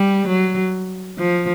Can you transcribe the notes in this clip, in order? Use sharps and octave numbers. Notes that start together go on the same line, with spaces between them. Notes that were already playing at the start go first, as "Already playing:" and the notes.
Already playing: G3
F#3
F3